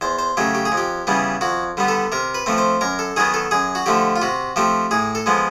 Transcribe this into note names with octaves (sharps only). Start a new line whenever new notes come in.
E2 C5
C5
C#3 F#3 A3 G4
G4
G#4
F2
G4
C#3 E3 G3 B3
F2 F#4
D3 G3 B3
A4
C3 A#4
B4
F3 A3 C4
C5
F#2 A#4
A4
D#3 F#3 B3 G#4
A4
F#2 G#4
F#4
D3 F3 A3 G4
F4
C3 F#4
F3 A3 C4 G4
A2 G#4
A4
F3 G#3 B3